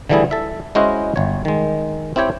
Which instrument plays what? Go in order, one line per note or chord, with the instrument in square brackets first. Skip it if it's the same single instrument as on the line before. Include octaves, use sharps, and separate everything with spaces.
[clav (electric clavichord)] D3 E3 G3 A3 E4 G#4
A4 E5
G#3 C#4 E4 F#4 C5 D#5
G1 C#5
D#3 G#3
C4 E4 G4 C#5 G5